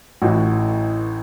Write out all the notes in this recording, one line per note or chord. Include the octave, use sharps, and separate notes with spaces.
A1 A2 E3 F#4